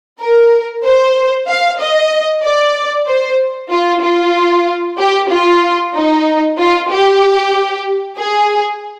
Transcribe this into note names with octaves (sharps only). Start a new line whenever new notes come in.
A#4
C5
F5
D#5
D5
C5
F4
F4
G4
F4
D#4
F4
G4
G#4